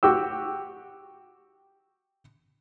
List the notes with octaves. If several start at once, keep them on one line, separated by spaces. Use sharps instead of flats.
F#4 G4 G5 E6